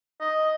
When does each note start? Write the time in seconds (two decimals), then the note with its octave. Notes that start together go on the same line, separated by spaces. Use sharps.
0.21 D#5